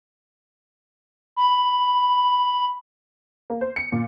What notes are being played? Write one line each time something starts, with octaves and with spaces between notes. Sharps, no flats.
B5
A#3
C5
C#7
A#2